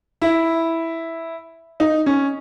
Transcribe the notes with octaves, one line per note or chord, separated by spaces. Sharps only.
E4
D#4
C#4